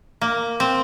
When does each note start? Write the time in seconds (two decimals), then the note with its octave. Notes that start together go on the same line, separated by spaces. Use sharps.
0.21 A#3
0.60 C4